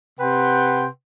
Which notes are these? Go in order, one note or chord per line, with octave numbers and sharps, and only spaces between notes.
C3 B4 F#5 G5 C6